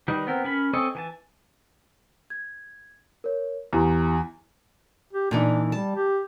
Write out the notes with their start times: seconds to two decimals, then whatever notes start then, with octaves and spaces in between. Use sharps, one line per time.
0.08 D#3 G3 D#4 B4
0.27 B3 C4 A#4
0.45 C#4 A#4 B5
0.73 C4 A4 C#5 D#5 G#5
0.95 E3 G#5 A5
2.30 G#6
3.24 A#4 C#5
3.73 E2 E4 G4 A#5
5.13 G4
5.31 A#2 E3 D4 D#4
5.72 G3 A5
5.95 G4